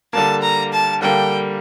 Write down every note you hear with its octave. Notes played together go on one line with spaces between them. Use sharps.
D3 G3 A#3 A5
A#5
A5
D3 G3 A#3 G5